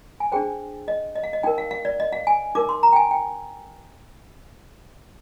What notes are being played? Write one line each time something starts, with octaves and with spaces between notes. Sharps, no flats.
G#5
D4 G#4 C5 G5
D#5
D#5
F5
D#5
D#4 A#4 G5
F5
F5
D5
D#5
F5
G#5
D#4 A#4 D6
C6
A#5
G5
G#5
G5